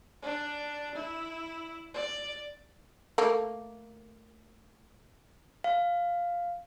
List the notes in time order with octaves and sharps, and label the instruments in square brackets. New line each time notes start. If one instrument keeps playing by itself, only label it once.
[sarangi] D4
E4
D5
[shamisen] A3 A#3
[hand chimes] F5